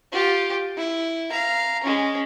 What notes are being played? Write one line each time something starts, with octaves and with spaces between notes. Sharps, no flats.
F4 G4
E4
F5 A#5
G#3 C#4